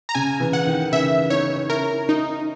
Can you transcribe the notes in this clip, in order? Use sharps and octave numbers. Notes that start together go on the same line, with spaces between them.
A#5
C#3 G#5
C#3 E3
F#5
D#3
C#3 E3 E5
B3 D#4 C#5
C#4 E4 A#4
D#4